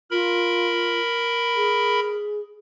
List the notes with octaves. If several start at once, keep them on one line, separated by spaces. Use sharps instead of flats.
F4 A#4 B5
G#4